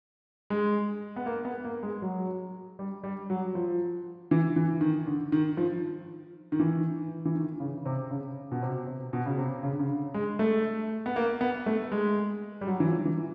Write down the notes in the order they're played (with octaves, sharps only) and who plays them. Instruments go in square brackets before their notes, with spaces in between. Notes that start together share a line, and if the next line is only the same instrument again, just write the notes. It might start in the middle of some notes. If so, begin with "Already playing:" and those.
[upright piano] G#3
B3
A#3
B3
A#3
G#3
F#3
G3
G3
F#3
F3
E3
E3
D#3
D3
D#3
F3
D#3
E3
E3
D#3
C#3
C3
C#3
B2
C3
C3
B2
C#3
C3
C#3
D3
C#3
D3
G#3
A3
B3
A#3
B3
A3
G#3
G3
F#3
E3
F3
E3